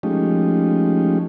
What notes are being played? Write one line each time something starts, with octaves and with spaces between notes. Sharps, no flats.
F3 G#3 A3 C#4 D#4 G4